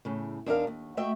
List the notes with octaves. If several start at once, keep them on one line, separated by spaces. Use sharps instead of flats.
E2 A2 C#3
E2 D4 D#4 A#4 F5
D#2
A3 F#4 D#5 E5 G5